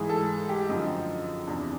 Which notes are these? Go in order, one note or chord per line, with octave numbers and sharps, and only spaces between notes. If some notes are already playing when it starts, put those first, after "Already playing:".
Already playing: G#2 E3 G#4
A4
G4
F#2 D3 F3 D#4
E2 C3 E3 D4